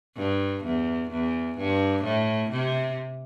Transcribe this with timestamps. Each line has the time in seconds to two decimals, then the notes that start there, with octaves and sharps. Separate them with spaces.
0.17 G2
0.64 E2
1.11 E2
1.58 G2
2.04 A2
2.51 C3